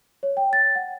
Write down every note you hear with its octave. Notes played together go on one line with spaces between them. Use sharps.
C#5
G5
A6
F#5